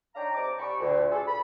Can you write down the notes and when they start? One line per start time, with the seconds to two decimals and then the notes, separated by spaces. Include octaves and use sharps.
0.15 D4 D#4 C#5 F5 G5 A#5
0.34 C3 A5 D6
0.58 C2 G4 D5 A5 B5 C#6
0.79 D2 A#2
1.11 D4 G#4 A4
1.27 B5